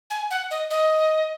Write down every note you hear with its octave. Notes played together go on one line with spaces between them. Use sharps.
G#5
F#5
D#5
D#5